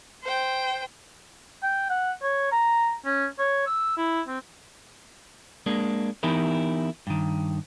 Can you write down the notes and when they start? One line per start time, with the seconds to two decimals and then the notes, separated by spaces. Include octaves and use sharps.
0.23 C5 G5
1.63 G5
1.90 F#5
2.22 C#5
2.52 A#5
3.06 C#4
3.39 C#5
3.67 E6
3.97 E4
4.28 C4
5.66 G#3 A#3 D4
6.23 E3 B3 D#4 E4 G4 A#4
7.07 G2 D#3